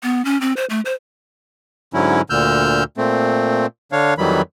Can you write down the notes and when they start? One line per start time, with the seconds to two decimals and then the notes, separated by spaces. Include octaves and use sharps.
0.03 B3
0.25 C#4
0.41 C4
0.57 C5
0.70 A3
0.85 C5
1.94 G#2 D3 F#3 C#4 E4
2.30 D2 A#2 D3 E6 F6 G6
2.97 A#2 A3 C4
3.92 D3 D4 C#5 F5
4.18 F2 D#3 E3 F#3 G3 B5